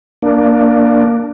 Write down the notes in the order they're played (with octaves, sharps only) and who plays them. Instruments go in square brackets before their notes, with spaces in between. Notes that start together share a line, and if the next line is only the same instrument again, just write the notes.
[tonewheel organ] A#3 D4